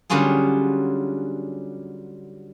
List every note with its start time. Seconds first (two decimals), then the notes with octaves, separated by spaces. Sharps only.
0.10 D3 F#3 G3 C#4 F4 G#4